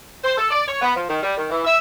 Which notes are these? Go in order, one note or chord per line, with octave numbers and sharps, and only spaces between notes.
C5
A4
D5
C#5
B3
F3
D#3
G3
D#3
E3
E5